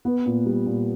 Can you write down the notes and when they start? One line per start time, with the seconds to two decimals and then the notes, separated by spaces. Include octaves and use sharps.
0.05 B3
0.26 A#2
0.46 G3
0.66 A#2